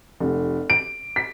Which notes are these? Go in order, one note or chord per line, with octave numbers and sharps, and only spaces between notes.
F1
D7
B6